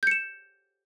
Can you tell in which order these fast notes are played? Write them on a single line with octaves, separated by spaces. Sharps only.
G6 C#7 E7